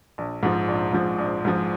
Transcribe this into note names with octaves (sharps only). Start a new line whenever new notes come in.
A#1
G#2 F3
A#1
G#2 F3
A#1
G#2 F3